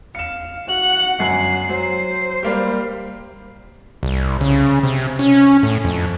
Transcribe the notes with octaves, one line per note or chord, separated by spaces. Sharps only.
F5 C#7 E7
F#4 F#5 F#7
G1 F#2 G#5 C7
F#3 C5
G3 A#3 G4
C2
C#3
C3
C#4
A2
F2